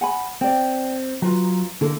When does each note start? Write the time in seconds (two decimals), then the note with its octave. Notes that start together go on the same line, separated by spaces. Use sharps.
0.01 F#5 G#5 B5
0.41 C4 D5 G5
1.22 F#3 F4 B4 A#5
1.81 D3 A#3 E4 A4